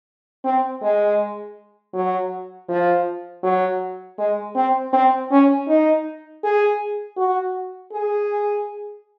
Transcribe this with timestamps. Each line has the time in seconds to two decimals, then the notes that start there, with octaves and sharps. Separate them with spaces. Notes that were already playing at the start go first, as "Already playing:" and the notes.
0.44 C4
0.82 G#3
1.94 F#3
2.69 F3
3.43 F#3
4.18 G#3
4.55 C4
4.93 C4
5.31 C#4
5.68 D#4
6.43 G#4
7.17 F#4
7.93 G#4